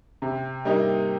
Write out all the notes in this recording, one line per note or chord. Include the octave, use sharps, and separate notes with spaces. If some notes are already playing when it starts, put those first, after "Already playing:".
C3
G3 A#3 D#4